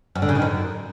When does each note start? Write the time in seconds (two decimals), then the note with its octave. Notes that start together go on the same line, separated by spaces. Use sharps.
0.15 F#2
0.22 D3
0.29 C#3
0.35 D#3
0.42 F#2